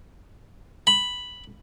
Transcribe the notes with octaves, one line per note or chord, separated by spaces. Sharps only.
B5